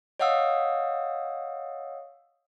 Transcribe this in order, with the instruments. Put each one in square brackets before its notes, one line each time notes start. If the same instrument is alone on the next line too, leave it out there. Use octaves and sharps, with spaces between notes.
[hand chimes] C#5 D#5 F5 F#5 D#6 E6